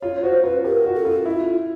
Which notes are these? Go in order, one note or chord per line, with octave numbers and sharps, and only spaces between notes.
F4 C#5
F#4 C5
F4 B4
G4 A#4
F#4
A4
F4
E4 F4